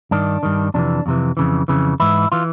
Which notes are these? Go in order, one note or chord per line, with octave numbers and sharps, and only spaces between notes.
G2 D#3 D4
G2 D#3
F2 C3 E3 D4
F2 C3 E3
F2 C#3 E3
F2 C#3 E3
G#2 E3 E4
E3 F4